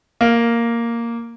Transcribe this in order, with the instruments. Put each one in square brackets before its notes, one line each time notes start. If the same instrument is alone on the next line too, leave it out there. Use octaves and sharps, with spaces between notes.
[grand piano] A#3